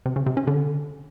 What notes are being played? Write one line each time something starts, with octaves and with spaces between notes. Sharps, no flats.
C3
C#3
C3
C#4
D3